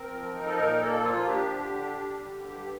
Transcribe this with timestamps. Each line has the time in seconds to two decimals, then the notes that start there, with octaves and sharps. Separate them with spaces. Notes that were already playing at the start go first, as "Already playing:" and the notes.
Already playing: C4 A#4
0.09 F3
0.33 D#4
0.46 A4
0.56 A#2 A#4
0.79 A#3 A4
1.03 F3 F4
1.27 D4 G4
1.50 D3
1.73 D4
1.97 G3
2.20 D3
2.44 G2 G4